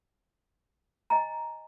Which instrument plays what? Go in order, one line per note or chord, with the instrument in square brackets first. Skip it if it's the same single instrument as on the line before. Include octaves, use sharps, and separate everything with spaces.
[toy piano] D#5 G#5 A#5